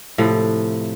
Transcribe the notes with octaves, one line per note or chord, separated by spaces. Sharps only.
A2 C3 F3